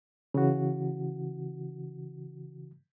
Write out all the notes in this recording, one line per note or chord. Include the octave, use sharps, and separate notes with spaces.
C#3 E3 F#4